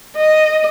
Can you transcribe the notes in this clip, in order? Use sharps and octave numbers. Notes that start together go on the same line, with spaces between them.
D#5